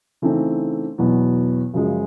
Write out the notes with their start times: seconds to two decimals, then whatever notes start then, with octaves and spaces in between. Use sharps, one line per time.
0.22 C#3 E3 A3 C4 D#4
0.98 E2 B2 F#3 B3
1.74 F#2 C#3 F3 G#3